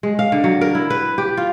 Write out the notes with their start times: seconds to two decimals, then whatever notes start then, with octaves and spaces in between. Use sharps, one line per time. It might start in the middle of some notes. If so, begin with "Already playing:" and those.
0.03 G#3
0.19 F5
0.32 D3
0.44 F#3
0.61 A#4
0.75 E4
0.90 B4
1.18 G4
1.37 F4